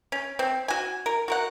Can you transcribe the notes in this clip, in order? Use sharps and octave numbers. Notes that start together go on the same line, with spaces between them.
C#4
C4
F#4 G#5
A#4
F#4 A#4 F#5